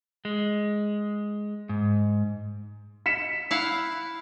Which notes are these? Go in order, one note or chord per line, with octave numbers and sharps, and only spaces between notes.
G#3
G#2
B6 C#7 E7
E4 F5 F#5